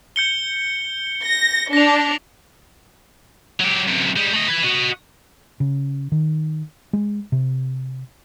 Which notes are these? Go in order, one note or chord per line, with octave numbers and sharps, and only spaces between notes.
G6 C#7 G7
A#6
D4 A#6 F7
F#3 G4
F#2 C3
G3 G#3
A3 D#5
B4 G#5
F#4 D#5
C#3
D#3
G#3
C3